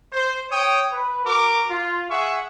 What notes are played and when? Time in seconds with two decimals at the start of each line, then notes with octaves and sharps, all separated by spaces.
0.13 C5
0.51 C#5 G5 D#6
0.92 B4
1.25 F#4 A#4 D6
1.70 F4
2.10 G#4 E5 F#5 C#6